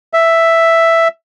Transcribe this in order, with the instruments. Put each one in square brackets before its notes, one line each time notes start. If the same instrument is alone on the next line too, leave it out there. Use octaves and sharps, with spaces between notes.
[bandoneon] E5